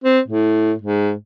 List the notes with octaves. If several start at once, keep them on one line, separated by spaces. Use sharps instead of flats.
C4
A2
G#2